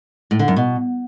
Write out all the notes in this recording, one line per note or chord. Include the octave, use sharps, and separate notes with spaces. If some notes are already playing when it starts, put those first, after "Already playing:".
A2
D3
F#2
B2